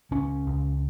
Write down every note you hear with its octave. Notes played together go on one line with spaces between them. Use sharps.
C#2 C#4
C#2